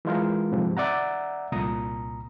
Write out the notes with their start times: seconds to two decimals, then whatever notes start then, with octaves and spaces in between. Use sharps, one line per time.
0.05 E3 G#3 F4 A#4
0.52 G#2 C3 F3
0.77 D5 E5 F#5 A#5
1.52 C2 A#2 A#5 D#6